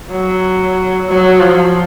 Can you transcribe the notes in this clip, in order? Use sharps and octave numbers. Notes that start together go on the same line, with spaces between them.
F#3
F#3
F3